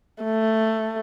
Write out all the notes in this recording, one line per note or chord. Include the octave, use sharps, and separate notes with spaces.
A3